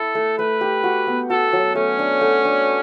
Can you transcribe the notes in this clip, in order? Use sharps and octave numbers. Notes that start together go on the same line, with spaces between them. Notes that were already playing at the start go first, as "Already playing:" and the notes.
Already playing: E4 A4
A3
A3 B4
G4
F#4
B3
F#4 A4
F#3
A3 C#4
D4
A3
D4